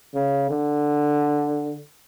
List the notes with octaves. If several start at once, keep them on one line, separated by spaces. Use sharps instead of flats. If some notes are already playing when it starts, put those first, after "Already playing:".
C#3
D3